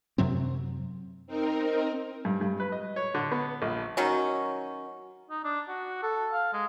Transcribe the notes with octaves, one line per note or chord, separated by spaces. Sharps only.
F#2 C3 F#3 C4
C4 D#4 A#4
G2
G2
B4
D#5
C#5
D3
B3
A#1
D#3 F#3 C#4
D#4
D4
F#4
A4
F5
G#3